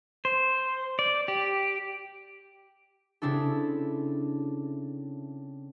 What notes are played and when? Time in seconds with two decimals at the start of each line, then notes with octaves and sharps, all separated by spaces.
0.25 C5
0.99 D5
1.28 G4
3.22 C#3 C4 D4 E4 A4